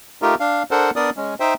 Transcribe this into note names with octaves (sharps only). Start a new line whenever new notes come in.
A3 D#4 F4 G4 A#4
D4 F5
D4 A4 A#4 C5 F#5
B3 D4 A#4 D5 D#6
G#3 C#4
D#4 C5 E5 G5